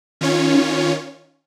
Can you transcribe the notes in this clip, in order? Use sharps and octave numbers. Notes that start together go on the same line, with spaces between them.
D#3 C#4 F4 C#5